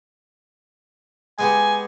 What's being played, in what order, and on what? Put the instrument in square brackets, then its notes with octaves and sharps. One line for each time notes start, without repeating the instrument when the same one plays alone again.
[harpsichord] G#3 B3 G4 [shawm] G#5